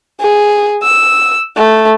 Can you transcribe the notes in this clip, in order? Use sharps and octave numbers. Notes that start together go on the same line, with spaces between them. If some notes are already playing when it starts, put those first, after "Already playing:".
G#4
E6
A3